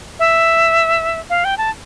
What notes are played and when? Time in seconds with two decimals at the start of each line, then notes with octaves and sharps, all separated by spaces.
0.19 E5
1.30 F5
1.44 G5
1.58 A5